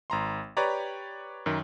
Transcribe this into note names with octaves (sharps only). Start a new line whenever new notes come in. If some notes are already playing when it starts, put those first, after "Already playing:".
G#1 A#5 C6
G4 B4 C#5 D5 A#5
F#2 D#3